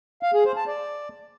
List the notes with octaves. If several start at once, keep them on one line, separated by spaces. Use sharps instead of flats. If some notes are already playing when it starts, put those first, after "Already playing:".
F5
G#4
C5
A5
D5